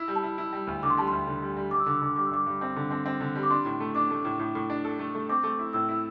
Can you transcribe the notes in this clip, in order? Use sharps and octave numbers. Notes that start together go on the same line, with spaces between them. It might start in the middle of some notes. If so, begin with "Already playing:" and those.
Already playing: E4
G3
A5
E4
E4
G3
D2
D3 D6
C6
G3 A5
D2 C6
D3
G3
G3
G3 D6
E6
D3 D6
E6
D3 D6
G3 D6
E6
G2 D6
G2
C4
D3
C4
C4
D3
G3
D6
D4 C6
A2
A3
D4 D6
A3
A2
A2
A2
D4
A4
A3
A3
C4 D6
A3
E4
A2 E6
E4